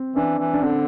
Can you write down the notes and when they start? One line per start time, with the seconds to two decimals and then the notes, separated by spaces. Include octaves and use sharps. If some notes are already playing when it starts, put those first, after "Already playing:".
Already playing: C4
0.16 E3 D4
0.39 E3
0.54 D4
0.62 D3 C4